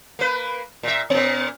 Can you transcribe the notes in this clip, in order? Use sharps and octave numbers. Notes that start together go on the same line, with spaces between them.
A#3 B4
A#2 E5
A#2 B3